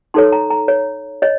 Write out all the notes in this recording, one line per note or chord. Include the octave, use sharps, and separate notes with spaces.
D#4 A4 C#5 C6
A#5
A#5
C#5
C#5 D#5